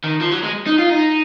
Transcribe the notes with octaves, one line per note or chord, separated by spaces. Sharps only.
D#3
F3
F#3
G#3
D#4
F4
D#4